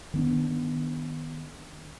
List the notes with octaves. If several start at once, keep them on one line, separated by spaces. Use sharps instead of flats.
D#3 B3 D4